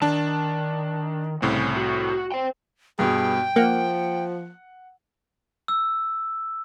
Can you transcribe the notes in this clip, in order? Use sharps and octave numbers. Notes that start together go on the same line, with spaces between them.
D#3 D4 A5
C2 A2 C#3 C4
F#4
C5 G5
G2 B2 G#4 G5
F3 A#3 F#5
E6